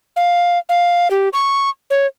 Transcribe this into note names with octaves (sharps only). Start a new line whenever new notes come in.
F5
F5
G4
C#6
C#5